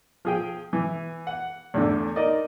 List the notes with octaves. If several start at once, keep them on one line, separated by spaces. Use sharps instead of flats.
F3 G#4 G5
E3
F#5
E2 A2 D3
D#4 A#4 D5 D#5